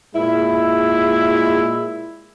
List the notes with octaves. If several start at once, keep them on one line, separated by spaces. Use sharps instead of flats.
A#2 G#3 E4